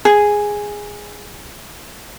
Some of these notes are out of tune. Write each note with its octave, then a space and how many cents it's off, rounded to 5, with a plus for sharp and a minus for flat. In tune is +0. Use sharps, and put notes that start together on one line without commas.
G#4 -5